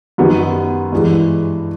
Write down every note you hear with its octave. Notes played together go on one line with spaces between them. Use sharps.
F#2 D#3 G3 B3
G2 E3 G#3